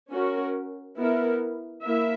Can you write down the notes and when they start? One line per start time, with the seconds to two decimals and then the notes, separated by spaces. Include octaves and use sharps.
0.10 C#4 F#4 A#4
0.98 B3 E4 A#4
1.84 A#3 E4 A#4 E5